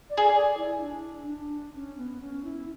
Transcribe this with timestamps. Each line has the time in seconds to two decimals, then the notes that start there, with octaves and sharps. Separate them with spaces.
0.10 D5
0.17 G#4
0.34 D5
0.57 E4
0.81 D4
1.27 D4
1.75 C#4
1.98 B3
2.21 C#4
2.44 E4